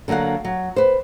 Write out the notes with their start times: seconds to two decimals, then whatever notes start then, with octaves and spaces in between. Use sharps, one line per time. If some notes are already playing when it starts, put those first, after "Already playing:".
0.08 D3 F#3 A#3 F5 F#5
0.45 F#3
0.76 B4 C5